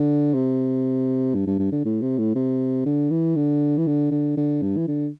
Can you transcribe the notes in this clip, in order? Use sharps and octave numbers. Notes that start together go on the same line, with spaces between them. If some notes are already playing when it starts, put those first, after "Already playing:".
Already playing: D3
C3
G2
G2
G2
D3
A2
C3
A2
C3
D3
E3
D3
E3
D3
D3
D3
G2
E3
D3